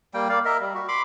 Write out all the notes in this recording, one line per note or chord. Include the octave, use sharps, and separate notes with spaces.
G3 A#3 G5
A#3 D5 F5
A#4 D#5 E5
G3
F#4
B5 C6 D6